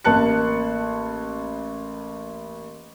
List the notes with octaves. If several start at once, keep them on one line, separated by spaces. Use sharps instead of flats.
A1 A#3 A5 F#6 C#7